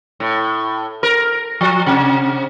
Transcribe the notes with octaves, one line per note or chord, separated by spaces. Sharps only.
A2
A#4
F3
C3